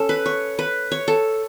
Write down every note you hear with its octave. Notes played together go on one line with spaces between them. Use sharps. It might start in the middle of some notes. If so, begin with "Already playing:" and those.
Already playing: C#4 A4
B4
C#5
B4
C#5
A4